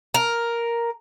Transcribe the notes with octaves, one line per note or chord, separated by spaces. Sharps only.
A#4